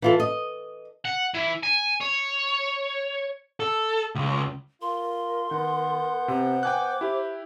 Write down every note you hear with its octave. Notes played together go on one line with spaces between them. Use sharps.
E3 F4 A4
D#5
F#5
E3
G#5
C#5
A4
C#2
F4 A#4 C6
D#3 B3 F#5 G6
C3 C5
G5 G#5 D6 F#6
E4 G4